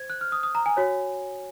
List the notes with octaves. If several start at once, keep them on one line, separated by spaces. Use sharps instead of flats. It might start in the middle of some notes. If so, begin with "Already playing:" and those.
Already playing: C5 G#6
F#6
F6
D#6
D#6
A#5
G#5
F#4 C#5